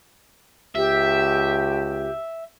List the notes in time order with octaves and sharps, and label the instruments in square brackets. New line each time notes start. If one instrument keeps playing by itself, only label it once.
[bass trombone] C#2 [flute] G4 [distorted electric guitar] E5